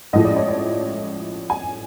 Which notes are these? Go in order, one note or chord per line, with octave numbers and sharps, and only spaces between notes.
A1 A2 F3 G#3 D#5
D5
C#5
D5
G#5